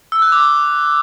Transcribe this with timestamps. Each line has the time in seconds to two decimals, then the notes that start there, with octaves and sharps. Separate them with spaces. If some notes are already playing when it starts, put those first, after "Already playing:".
0.12 E6
0.22 F#6
0.32 D6